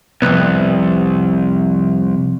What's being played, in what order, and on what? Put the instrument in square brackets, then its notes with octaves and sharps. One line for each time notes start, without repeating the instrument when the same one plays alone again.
[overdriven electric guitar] C2 [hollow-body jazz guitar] F2 B3